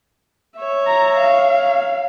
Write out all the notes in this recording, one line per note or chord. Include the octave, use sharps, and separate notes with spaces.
C#5 E5
A#5
F5